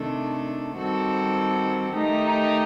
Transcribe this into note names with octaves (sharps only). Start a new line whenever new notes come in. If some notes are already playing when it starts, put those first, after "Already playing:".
Already playing: C3 D#3 A3 D4 A4
D#3 G3 C4 F#4 A4
D#3 A3 D#4 G4